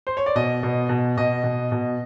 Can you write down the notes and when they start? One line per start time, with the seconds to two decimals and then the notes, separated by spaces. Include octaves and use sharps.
0.07 C5
0.17 C#5
0.26 D5
0.35 B2 D#5
0.63 B2
0.89 B2
1.17 B2 D#5
1.44 B2
1.72 B2